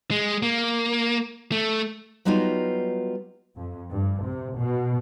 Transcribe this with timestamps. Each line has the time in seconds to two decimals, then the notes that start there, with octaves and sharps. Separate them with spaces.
0.11 G#3
0.43 A#3
1.52 A3
2.25 F#3 G3 B3 D#4 F4 F#4
3.56 F2
3.93 G2
4.25 C3
4.57 B2